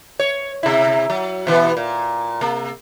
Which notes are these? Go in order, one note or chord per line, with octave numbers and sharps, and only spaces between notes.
C#5
C3 E4
F#3
B2 E3 B3
A#2
C3 A#3